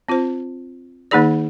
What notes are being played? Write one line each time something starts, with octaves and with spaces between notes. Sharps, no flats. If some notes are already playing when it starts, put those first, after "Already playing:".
C4 F4 C5
D#3 A#3 D#4 G#4 D5